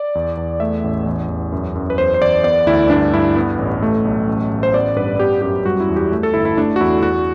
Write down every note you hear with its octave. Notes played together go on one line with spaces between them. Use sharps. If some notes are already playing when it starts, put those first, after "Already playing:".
Already playing: D5
E2
E2
A3 E5
A1
E2
E2
F#2
F#2
B4
E2 C5
C5
E2 D5
B3 D5
D2 E4
G2 D4
G2 E4
B3
A1
A3
B1
A1
A1
C5
B3 D5
G2 B4
B3 G4
F#2 G4
G3 F#4
E4
E2
G4
A3
A4
G1 E4
E4
A3 D4
F#4
E2 E4
E2 F#4